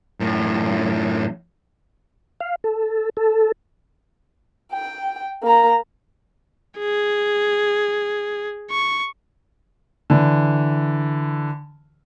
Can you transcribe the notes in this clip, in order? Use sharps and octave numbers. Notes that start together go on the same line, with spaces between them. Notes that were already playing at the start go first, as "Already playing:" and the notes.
F#2 A2
F5
A4
A4
G5
A#3 A#5
G#4
C#6
D3 E3